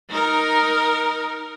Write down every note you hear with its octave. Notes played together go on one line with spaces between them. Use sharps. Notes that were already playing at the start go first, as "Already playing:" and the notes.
D#4 A#4